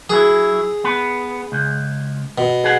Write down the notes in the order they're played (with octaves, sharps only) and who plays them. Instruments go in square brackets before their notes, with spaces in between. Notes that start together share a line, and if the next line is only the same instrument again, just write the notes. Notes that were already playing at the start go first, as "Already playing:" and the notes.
[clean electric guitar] F#3 E4 [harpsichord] G#4
[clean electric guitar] B3 B4
C#2
[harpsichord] B2
[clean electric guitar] G#4 F#5